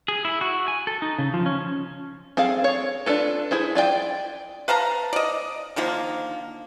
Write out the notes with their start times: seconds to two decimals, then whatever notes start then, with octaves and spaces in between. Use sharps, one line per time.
0.08 G#4
0.25 E4
0.41 F#4
0.68 G#5
0.87 A4
1.02 D#4
1.19 C#3
1.34 F3
1.46 C#4
2.37 C4 G#4 A4 F5
2.64 C#5
3.06 D4 F4 A4 B4
3.51 E4 G#4 C5
3.75 F4 D5 E5 G5
4.68 B4 F5 A5 A#5
5.13 D5 D#5
5.76 D3 D#3 F3 A#3